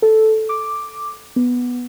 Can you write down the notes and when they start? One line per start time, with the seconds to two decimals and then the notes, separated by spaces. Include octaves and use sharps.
0.02 A4
0.49 D6
1.36 B3